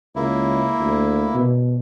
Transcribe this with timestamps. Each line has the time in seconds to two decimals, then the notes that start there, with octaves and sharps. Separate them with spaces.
0.16 C#2 A#3 E4
0.80 D2
1.35 B2